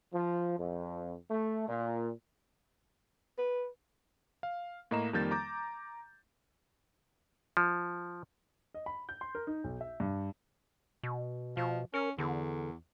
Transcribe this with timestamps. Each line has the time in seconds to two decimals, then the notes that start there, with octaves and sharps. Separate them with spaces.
0.14 F3
0.59 F2
1.30 A3
1.68 A#2
3.38 B4
4.43 F5
4.91 A2 A#3 D#5 A#5 E7
5.13 F2 D#3 G3 A#3 G6 A6
5.31 A#5 D6 G6
7.57 F3
8.74 D#5
8.86 B5
9.09 G6
9.21 C6
9.35 A#4
9.47 D#4
9.64 B1
9.81 E5
10.00 G2
11.03 B2
11.57 B2 F3
11.94 C#4 A#4
12.18 E2 D3